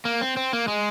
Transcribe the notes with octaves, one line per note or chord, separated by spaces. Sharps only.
A#3
C4
C4
A#3
G#3